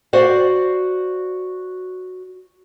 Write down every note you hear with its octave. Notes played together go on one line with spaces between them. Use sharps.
F#4 C5 D5 F5